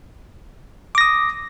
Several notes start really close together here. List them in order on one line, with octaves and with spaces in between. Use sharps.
D6 A#6 D#6